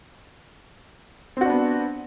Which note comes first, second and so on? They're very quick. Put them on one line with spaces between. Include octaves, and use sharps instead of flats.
C4 F#4 D4 B3